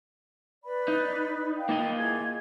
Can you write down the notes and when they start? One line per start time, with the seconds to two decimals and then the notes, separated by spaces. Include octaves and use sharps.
0.65 B4 D5 B5
0.88 D#4
1.58 F5 G5
1.69 A#3 F4 D#5
1.97 E4 G#4 G#6